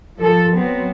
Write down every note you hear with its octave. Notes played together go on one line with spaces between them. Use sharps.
F3 A4
F#3 B3 C4